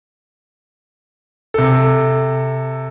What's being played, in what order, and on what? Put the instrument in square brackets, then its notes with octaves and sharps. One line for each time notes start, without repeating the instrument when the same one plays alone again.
[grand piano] C3 A4